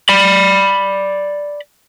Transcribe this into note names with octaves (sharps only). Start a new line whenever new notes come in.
D5 B5